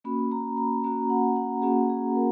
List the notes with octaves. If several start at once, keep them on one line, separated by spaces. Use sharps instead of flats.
A#3 C#4 F#4 B5
A#5
A#5
A#3 C#4 F#4 A#5
F#5
F#5
A#3 C#4 F#4 G#4
G#4
A#4